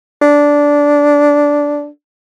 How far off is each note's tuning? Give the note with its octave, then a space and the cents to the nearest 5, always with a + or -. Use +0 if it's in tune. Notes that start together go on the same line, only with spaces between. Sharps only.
D4 -10